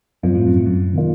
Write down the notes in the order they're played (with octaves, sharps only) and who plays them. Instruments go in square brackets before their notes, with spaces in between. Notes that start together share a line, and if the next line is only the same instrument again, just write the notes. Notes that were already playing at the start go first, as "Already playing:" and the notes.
[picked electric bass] F#2 [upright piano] F3 C4 F4
[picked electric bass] A2
F#2
A2
F#2
[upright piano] D#3 A#3 F4